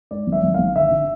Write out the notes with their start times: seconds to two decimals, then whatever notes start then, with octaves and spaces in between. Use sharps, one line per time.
0.11 G#2 D5
0.27 G#1
0.32 E5
0.43 G#1
0.54 G#1 F5
0.75 D3 E5
0.91 D3